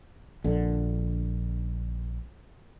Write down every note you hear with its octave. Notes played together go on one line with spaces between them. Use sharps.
A#1 D3